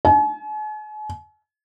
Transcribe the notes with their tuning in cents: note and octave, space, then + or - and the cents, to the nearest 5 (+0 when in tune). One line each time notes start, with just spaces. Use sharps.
G#5 +45